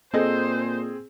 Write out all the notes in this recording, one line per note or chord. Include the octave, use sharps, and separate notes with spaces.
A#2 C4 G#4 A4 C5 D#5